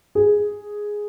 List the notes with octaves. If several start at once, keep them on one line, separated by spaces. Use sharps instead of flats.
G#4